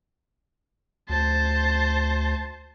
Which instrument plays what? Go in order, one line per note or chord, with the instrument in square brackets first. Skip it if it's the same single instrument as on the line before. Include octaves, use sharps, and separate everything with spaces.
[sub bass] D2 [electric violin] C5 A5